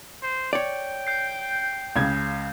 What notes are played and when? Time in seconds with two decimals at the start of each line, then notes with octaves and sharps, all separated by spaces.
0.23 C5
0.53 C#5 D5 G5
1.07 G6 C7
1.96 C#2 C#3 G#6